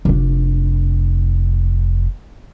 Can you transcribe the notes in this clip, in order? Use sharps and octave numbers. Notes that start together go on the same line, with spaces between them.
F1 D4